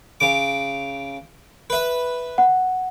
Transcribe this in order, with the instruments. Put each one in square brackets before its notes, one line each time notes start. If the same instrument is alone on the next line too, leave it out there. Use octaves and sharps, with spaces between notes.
[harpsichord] C#3 D6
B4 E5
[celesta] F#5